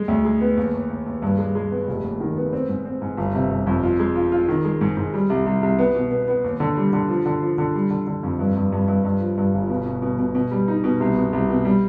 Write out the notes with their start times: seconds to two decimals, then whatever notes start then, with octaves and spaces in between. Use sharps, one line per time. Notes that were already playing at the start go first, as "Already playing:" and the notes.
Already playing: G#3
0.08 D2
0.25 G#3
0.41 B3
0.57 D#2
0.74 D#2
0.90 D#2
1.06 D#2
1.22 G2
1.38 G#3
1.55 G#3
1.71 B3
1.88 F1
2.04 D#2
2.20 D#3
2.37 B3
2.53 C4
2.69 G#2
2.85 C4
3.02 G#2
3.17 G1
3.34 C3
3.51 G1
3.67 F2
3.83 F4
3.99 G#3
4.16 F4
4.32 F4
4.48 D#3
4.64 G#3
4.81 G#2
4.97 G#2
5.14 G3
5.30 C2
5.46 C2
5.63 C2
5.79 B3
5.95 B2
6.11 B3
6.28 B3
6.44 D#2
6.60 D3
6.77 G3
6.93 D3
7.09 F3
7.26 D3
7.41 F3
7.58 D3
7.75 G3
7.90 D3
8.07 D3
8.23 F2
8.39 G2
8.56 G2
8.72 G2
8.88 G2
9.05 G2
9.21 F3
9.37 G2
9.54 G1
9.70 B2
9.86 B2
10.02 B2
10.19 B2
10.35 B2
10.51 G3
10.68 D#4
10.84 B2
11.00 C2
11.16 B2
11.33 C2
11.49 B2
11.65 G3